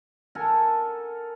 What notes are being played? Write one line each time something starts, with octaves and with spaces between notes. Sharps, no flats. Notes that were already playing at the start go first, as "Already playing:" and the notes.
A4 A#4 F#5 G#5